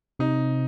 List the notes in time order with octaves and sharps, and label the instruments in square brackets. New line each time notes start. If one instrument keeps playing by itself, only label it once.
[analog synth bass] C3 [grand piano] D#4